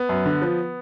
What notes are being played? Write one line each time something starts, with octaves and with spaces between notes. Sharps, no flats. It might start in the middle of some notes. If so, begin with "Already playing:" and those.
Already playing: B3
F#2
D3
F3